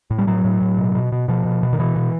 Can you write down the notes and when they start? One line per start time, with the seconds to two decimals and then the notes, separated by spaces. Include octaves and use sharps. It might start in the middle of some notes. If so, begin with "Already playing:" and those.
0.10 A2
0.18 G3
0.27 A2 F#3
0.44 A2
0.62 A2
0.78 B2
0.95 B2
1.12 B2
1.28 B2 F3
1.45 B2
1.63 B2
1.73 D#3
1.79 B2 E3
1.96 B2